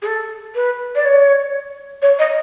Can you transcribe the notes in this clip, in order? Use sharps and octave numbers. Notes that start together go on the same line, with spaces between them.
G#4
A4
B4
D5
C#5
C#5
D#5